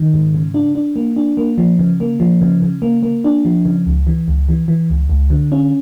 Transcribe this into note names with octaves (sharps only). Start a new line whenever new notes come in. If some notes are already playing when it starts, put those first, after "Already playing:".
Already playing: D#3
G#2
C#3
D4
D4
A#3
D4
A#3
F3
C#3
A#3
F3
C#3
C#3
A#3
A#3
D4
F3
C#3
C#2
E3
C#2
E3
E3
C#2
C#2
D3
C#4